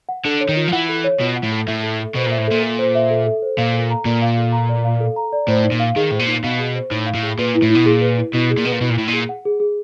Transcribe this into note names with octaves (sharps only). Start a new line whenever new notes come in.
F#5
D3 A4
C#5
D#3
F4
F3
E3 F#5
A4
C#5
B2 F4
F#5
A2
A4
A2 E5
A4
A4
B2 C5
A#2 E5
A2
A#2 A4
A4
C5
E5
A4
A4
C5
A#2 F5
A4
A#5
A#2 D5
F5
A4
A#5
D5
F5
A4
A#5
D5
A2 C5
D#4
A#2
F5
D#3 G#4
A2 C5
A#2
D#4
B2 F5
G#4
C5
A2 D#4
F5
A2
G#4
A#2 B4
E4
A2
B2 E4
A#2 G#4
B4
E4
B2 E4
G#4
A#2
B2 B4
A#2
B2 E4
A#2
A2 E4
A#2
G#4
F#5
G#4
G#4